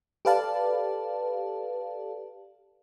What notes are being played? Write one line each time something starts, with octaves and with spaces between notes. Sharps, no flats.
G4 A4 B4 D5 F5 A5